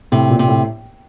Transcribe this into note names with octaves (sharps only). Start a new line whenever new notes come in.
A2 C3
A#2
C3
A2